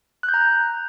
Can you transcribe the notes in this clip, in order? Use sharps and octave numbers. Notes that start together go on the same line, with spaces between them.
F#6
G6
A#5